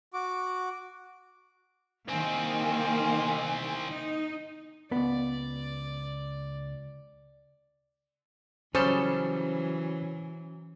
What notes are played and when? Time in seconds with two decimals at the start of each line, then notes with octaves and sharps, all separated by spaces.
0.14 F#4 D6
2.08 C2 D#3 A#3 C4 G#5
3.89 D#4
4.92 C#2 B3 D5
8.75 C#3 E3 F#3 G3 C#4 A4 C5